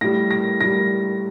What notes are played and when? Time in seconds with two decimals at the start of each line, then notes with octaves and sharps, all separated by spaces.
0.01 A2 G3 A#6
0.31 A#6
0.60 A2 G3 A#6